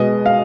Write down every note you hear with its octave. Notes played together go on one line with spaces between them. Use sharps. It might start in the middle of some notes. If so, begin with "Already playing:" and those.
Already playing: B2 G#3 B3 D#5
F5